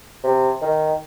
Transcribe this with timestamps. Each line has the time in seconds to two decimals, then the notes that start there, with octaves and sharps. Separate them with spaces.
0.23 C3
0.61 D#3